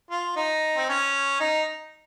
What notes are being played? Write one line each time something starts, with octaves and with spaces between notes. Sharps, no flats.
F4
D#4
C4
C#4
D#4